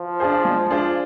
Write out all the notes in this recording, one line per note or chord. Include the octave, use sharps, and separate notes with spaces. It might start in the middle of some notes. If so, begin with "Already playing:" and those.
Already playing: F3
D4 F4 G#4 C5
G#3
D4 F4 G#4 C5